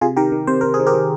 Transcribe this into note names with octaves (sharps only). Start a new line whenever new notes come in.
C3 F4 G#4
D#3 G4 A#4
D#3
C3 C5
C3 A#4
G#4
D#3
G4 A#4
D#3